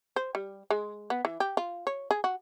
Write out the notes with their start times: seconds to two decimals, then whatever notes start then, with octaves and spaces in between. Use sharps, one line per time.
0.16 C5
0.35 G3
0.71 G#3
1.10 B3
1.25 E3
1.40 G4
1.57 F4
1.87 C#5
2.11 G#4
2.24 F#4